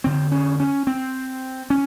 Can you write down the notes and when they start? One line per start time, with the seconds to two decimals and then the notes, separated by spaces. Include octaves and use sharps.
0.04 F2 D3 C4
0.32 C#4
0.60 C#4
0.87 C4
1.70 C#4